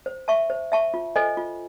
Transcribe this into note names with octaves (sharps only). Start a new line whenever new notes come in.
C5
E5 A5 C#6
C5
E5 A5 C#6
F4
A4 C5 D#5 G#5
F4